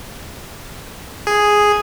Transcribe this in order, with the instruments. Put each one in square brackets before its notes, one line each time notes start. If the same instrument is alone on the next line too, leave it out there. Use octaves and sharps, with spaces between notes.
[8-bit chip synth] G#4